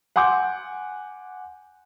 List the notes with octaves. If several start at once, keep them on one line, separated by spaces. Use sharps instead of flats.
F#5 G#5 C6 D6 G6